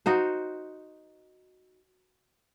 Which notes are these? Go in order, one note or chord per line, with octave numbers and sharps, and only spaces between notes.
D#4 F#4 C5